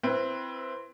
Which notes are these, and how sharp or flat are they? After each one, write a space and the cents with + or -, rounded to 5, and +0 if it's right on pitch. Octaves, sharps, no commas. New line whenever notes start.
C4 +0 E4 +25 B4 -10